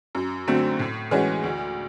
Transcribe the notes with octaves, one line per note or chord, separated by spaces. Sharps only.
F#2
D3 F#3 A3 C4
A2
E3 G#3 C#4 F#4
D2